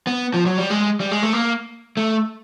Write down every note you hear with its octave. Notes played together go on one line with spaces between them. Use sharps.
B3
F3
F#3
G3
G#3
G3
G#3
A3
A#3
A3